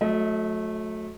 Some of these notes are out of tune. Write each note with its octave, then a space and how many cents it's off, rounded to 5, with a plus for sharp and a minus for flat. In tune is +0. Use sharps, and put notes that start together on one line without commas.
F#3 -30 A3 -15 D#5 +40